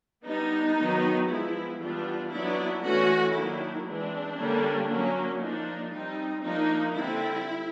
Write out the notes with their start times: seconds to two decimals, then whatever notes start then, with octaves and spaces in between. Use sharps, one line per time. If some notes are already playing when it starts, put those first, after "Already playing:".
0.25 G3 B3 D4 D#4
0.76 D#3 F#3 B3
1.28 F3 G#3 B3 E4
1.80 E3 G3 B3 D4 F4
2.32 F#3 B3 D4 E4
2.82 E3 A3 C#4 F#4
3.34 D#3 F#3 A#3 D4 E4
3.85 E3 G#3 C4 D4
4.37 D3 G3 A#3 C#4
4.89 F#3 A#3 C#4
5.40 F3 A#3 D4 D#4
5.91 G3 C4 D#4
6.43 F3 A#3 D4 D#4
6.94 D3 G3 C4 E4